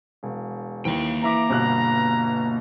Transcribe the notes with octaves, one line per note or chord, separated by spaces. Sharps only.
E1
D#2 E3 A#3 G5
E3 E5 A#5 D6
G1 B2 F#6